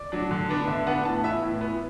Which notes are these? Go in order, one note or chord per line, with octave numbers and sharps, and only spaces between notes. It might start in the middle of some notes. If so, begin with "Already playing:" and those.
Already playing: D5
F#3 D4
D3
B3 D4
D3 E5
B3 D4 F#5
A2 A5
F#5
E3 B3 E5
A2
E3 B3